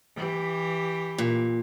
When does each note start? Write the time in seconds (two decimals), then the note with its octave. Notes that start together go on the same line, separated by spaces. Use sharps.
0.16 E3 G4
1.18 A#2